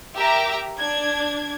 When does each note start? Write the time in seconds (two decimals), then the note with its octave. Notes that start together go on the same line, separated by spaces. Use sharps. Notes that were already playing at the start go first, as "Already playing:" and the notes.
0.15 G4 A#4 E5 A#5
0.79 D4 G#6